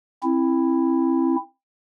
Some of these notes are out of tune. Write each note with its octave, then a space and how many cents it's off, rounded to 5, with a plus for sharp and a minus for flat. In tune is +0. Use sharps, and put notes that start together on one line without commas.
C4 +25 E4 +5